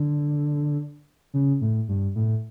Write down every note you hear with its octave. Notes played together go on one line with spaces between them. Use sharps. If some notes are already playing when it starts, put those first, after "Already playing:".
Already playing: D3
C#3
A2
G2
A2